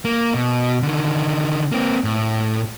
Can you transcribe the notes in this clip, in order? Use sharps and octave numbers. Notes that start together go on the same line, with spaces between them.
A#3
B2
D3 D#3
A#3 C4
A2